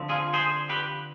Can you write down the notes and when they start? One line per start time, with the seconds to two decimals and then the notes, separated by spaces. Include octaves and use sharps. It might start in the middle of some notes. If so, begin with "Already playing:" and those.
Already playing: D3 F3 C4
0.09 F4 G#4
0.33 G#4 C5
0.69 G4 B4